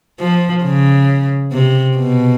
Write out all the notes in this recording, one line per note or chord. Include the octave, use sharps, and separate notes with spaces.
F3
C#3
C3
B2